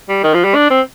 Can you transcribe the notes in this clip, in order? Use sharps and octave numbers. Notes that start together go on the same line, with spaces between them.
G3
D#3
F3
G3
D4
C4